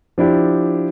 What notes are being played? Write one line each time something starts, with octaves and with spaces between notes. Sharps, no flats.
F3 D4 E4 G4